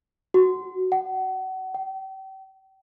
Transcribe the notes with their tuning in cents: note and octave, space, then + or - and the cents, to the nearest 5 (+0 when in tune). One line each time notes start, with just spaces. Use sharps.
F#4 +10
F#5 +30
G5 -35